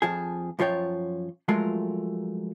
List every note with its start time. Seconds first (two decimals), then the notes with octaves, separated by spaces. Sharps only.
0.02 F2 F3 G#4
0.59 F#2 F3 F4 C#5 G5
1.48 F3 F#3 G#3 A3 F4 A#4